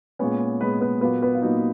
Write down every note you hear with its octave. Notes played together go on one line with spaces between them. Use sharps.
A#2 G#3 B3 C#4 C#5
A#2 G#3 B3 B4
B3 B4
A#2 F#3 A#3 B3 B4
B3 B4
F4
A#2 F#3 A#3 D#4